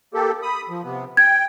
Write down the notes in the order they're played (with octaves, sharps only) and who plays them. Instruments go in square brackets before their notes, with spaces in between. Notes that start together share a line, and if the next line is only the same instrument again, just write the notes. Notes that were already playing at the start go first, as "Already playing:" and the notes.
[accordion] A#3 G4 A4
B5 D#6
F3
C3 B3
[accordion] G5 [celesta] G#6